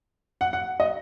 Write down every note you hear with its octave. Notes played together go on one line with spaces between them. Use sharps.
F#5
F#5
D#5